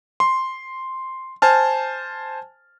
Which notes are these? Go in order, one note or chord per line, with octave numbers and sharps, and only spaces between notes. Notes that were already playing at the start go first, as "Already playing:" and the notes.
C6
C5 G#5 A5 F6